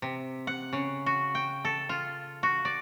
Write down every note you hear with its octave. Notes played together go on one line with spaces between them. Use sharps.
C3
F#5
C#3
F#4
G5
A4
F4
F#4
D5